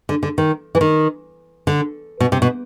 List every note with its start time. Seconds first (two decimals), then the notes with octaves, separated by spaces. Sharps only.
0.09 D3
0.23 D3
0.38 D#3
0.75 E3
0.81 D#3
1.67 D3
2.20 B2
2.32 C3
2.42 B2